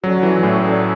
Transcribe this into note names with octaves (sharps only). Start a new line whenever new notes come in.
F#3 C#4 F#4 A4 D5
E3
A2
C#4 F#4 A4 D5